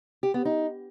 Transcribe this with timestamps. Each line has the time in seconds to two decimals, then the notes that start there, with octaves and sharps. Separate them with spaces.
0.23 G4
0.34 B3
0.45 D#4